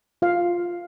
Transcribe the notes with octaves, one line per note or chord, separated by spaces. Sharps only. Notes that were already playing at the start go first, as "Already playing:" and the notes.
F4 F5